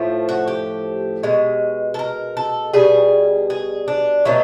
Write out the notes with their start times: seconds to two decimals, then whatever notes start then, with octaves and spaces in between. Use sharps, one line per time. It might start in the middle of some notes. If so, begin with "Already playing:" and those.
Already playing: A2 F3 A3
0.29 F#4
0.48 G4
1.23 B2 G#3
1.94 A4
1.99 A#4
2.37 A4
2.74 B2 G3 G#4
3.50 G#4
3.88 D4
4.25 B2 F#3 A3 D#4